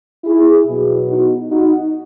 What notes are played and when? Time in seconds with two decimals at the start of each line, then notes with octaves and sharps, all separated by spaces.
0.24 E4 G#4
0.67 B2 F#3
1.10 D#4 F#4
1.52 D#4 F#4